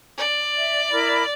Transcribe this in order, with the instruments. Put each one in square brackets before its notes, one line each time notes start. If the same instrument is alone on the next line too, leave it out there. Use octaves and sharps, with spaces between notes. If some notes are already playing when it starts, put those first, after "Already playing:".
[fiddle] D5
[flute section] E5
E4 A#4 B5